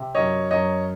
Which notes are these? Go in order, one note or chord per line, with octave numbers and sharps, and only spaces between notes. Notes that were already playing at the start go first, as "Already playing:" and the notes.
Already playing: C3
F#2 C#5 D#5
F#2 C#5 D#5